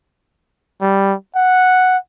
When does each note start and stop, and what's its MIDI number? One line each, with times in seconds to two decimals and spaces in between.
0.81 1.15 55
1.36 1.97 78